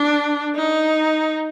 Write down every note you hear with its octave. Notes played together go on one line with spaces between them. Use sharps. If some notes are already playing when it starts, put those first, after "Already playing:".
Already playing: D4
D#4